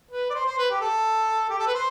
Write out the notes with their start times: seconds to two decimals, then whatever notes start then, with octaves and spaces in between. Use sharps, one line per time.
0.11 B4
0.30 D5
0.34 C5
0.46 C5
0.58 B4
0.70 G4
0.81 A4
1.50 G4
1.58 A4
1.66 B4
1.74 C5